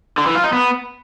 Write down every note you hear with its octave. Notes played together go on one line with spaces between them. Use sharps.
D3
E3
F4
D#4
B3